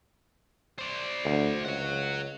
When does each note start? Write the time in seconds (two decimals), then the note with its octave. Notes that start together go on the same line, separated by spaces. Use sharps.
0.79 C5 D5
1.25 D2
1.65 C#2 C#5 F#5